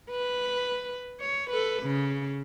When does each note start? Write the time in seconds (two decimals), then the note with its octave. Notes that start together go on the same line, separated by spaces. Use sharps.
0.11 B4
1.21 C#5
1.50 A4 B4
1.83 C#3